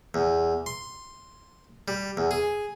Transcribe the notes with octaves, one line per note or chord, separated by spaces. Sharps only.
E2
C6
G3
E2
G#4